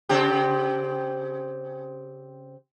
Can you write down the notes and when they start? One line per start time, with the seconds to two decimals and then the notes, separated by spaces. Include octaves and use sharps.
0.09 C#3 C4 G4